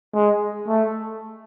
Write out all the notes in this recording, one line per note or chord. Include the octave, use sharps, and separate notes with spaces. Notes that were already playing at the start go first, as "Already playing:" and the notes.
G#3
A3